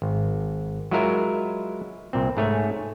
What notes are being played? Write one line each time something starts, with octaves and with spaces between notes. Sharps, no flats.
G#1
F#3 G#3 E4 F4 A#4 E5
C2 A#2 C4
G#2 A3 C#5 G#5